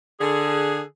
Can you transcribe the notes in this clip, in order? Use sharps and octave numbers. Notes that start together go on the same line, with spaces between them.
D3 G#4